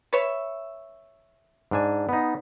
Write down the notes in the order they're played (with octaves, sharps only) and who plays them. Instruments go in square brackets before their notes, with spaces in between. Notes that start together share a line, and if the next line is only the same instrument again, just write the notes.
[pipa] B4 C#5 E5
[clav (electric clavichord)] G#2 D4 G#5
B3 D#4